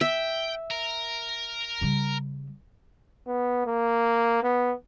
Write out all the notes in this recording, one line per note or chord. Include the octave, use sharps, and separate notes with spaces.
E5 G5
A#4
C#3 G3
B3
A#3
B3